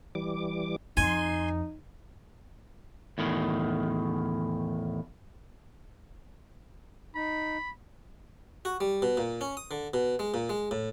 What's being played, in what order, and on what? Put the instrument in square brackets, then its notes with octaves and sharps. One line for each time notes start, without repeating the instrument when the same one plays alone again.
[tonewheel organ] E3 G3 D6
[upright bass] F2 [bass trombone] D#4 [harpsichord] G#5 [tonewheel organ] C6
[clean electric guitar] E2 A2 D#3
[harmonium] D#4 [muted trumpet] B5
[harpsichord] F#4
G3
B2
A#2
C#4
D#6
D3
B2
G#3
A#2
G#3
A2